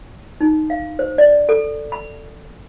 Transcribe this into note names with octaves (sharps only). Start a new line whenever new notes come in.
D#4
F5
C5
D5
A4
B5